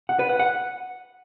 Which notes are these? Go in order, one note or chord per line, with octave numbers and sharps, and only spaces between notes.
F#5
B4
F#5
F#5